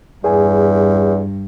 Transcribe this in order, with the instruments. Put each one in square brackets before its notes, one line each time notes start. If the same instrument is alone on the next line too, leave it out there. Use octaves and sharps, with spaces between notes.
[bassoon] E2 [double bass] G2 [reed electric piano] G#4 G#5